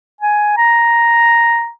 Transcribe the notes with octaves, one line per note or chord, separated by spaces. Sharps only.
G#5
A#5